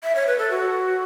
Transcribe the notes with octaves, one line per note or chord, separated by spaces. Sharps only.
E5
C#5
B4
A4
F#4